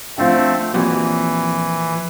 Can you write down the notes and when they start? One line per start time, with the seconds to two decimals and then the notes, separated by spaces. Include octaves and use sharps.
0.18 D3 F3 A3 C4
0.74 F2 A#2 E3 F#4 G4 C#5